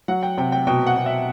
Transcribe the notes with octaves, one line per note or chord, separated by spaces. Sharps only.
F#3 F#5
G5
C3 G5
G5
B2 G5
F#5
B2
E5